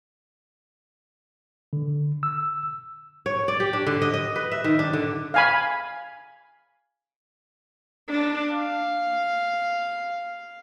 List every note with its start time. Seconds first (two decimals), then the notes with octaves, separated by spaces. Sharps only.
1.73 D3
2.23 E6
3.26 C#5
3.48 D5
3.60 G4
3.73 D4
3.86 D3
4.02 D#5
4.14 D#5
4.36 B4
4.52 E5
4.64 D#3
4.79 D4
4.93 D3
5.34 F5 G#5 B5
8.09 D4
8.53 F5